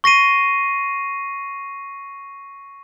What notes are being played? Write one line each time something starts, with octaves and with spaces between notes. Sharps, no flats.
C#6 A#6 C7 D#7